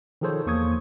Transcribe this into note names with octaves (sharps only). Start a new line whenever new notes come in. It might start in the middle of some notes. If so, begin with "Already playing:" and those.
D#3 F3 G#4 A4 C5 C#5
E2 A#3 C#6 D#6 G#6